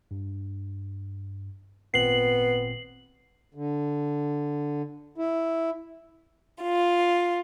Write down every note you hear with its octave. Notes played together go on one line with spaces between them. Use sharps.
G2
G#1 A#2 B3 C4 C7 F#7
D3
E4
F4